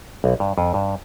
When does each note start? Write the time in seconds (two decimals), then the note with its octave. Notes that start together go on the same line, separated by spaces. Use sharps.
0.24 B1
0.40 G2
0.58 F2
0.74 G2